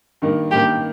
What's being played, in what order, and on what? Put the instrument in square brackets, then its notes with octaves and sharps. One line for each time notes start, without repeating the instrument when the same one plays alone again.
[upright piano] G2 D#3 A#3
[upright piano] G2 D#3 A#3 [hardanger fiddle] G4